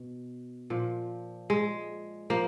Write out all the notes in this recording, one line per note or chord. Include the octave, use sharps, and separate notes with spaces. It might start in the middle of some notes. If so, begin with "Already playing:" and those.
Already playing: B2
A#2 F3
G#3
F3 A#3